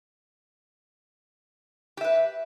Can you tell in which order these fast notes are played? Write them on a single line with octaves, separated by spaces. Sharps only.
G4 E5 B4